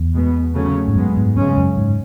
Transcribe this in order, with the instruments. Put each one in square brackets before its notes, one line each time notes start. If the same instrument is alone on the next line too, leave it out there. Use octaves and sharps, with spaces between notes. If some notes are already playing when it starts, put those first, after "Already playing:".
Already playing: [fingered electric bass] E2
[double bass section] B2 G#3 B3
C#3 F#3 A3 C#4
[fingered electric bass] G#2
[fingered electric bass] F#2 [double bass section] B2 G#3 B3
[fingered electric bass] G#2
[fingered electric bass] F#2 [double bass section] C#3 G#3 C#4
[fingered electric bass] F#2
G#2